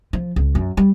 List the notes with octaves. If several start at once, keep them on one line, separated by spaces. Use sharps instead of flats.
F3
C#2
F#2
G3